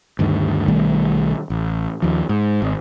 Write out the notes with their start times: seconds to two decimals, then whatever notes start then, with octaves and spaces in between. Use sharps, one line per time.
0.19 D2 G2 D#3
0.68 B1 D#3 G3 A3
1.50 A1
2.02 D#2 F3
2.29 G#2
2.62 G#1